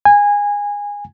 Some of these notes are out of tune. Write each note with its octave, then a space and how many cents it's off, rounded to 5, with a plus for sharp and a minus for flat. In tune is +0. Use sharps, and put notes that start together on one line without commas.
G#5 -20